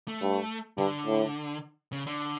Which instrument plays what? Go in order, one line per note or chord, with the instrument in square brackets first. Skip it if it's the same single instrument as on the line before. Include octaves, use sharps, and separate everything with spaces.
[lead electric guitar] A3
[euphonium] G2
[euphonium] G2 [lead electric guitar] D3
[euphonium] A2
[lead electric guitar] C#3
D3